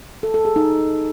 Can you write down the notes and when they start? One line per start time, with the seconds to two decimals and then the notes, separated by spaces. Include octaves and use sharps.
0.23 A4
0.34 A4
0.45 G#4
0.56 D#4